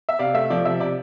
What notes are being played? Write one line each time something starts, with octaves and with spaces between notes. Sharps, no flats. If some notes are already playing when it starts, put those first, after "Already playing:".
E5
C3 D5 F5
A3 E5
F3 D5
C3 E5
C3 D5